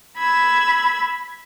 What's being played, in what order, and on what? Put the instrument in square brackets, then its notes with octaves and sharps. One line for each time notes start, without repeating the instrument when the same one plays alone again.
[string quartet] B5 E6 G#6